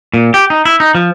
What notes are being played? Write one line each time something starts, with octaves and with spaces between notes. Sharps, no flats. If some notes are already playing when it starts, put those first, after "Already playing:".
A#2
G4
D#4
E4
D#4
F3